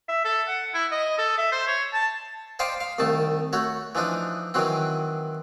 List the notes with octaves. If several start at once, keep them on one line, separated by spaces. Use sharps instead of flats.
E5
A4
F#5
E4
D#5
A4
E5
C5
C#5
A5
C5 D5 D#5 F5 G5 A5
F5
C2 D#3 A3 A5
A3 F#4 C#5
E3 F3 D4 D#4
D#3 E3 F#3 C4